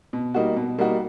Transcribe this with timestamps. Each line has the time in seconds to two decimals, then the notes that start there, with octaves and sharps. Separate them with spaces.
0.13 B2
0.34 G3 A#3 D#4 F#4
0.56 B2
0.79 G3 A#3 D#4 F#4